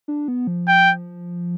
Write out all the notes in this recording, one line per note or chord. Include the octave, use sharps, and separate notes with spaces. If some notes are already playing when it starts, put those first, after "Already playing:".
D4
B3
F3
G5